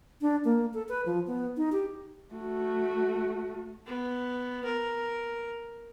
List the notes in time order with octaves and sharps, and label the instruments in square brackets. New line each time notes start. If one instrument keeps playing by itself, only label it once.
[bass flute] D4
A#3
A4
B4
F3
B3
D#4
G4
[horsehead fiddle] A3 F#4
[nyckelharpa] B3
A#4